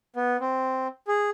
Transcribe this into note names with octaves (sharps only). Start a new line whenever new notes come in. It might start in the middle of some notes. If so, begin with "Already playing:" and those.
B3
C4
G#4